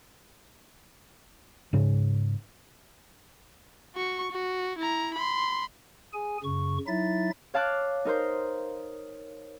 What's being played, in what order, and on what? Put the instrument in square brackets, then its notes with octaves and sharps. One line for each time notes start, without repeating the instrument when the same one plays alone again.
[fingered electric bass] G#2 C#3
[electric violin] F#4 C#6
F#4
E4 A#5
B5 C6
[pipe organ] G#4 G#5
F#2 C#3 C#6
F#3 D#4 E4 E5 A6
[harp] C#5 F5 A5 D6 F#6
D#4 A#4 C5